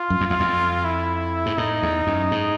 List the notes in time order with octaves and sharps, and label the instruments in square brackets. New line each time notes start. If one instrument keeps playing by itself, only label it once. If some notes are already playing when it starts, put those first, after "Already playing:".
Already playing: [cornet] F4
[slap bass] F#2
F2
E2
F2
[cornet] E4
[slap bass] G#2
[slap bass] A2 [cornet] D#4
[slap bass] E2
F#2
G#2